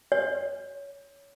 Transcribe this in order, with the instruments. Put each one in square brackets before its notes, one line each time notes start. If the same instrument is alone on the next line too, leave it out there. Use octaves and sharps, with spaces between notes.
[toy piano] C#5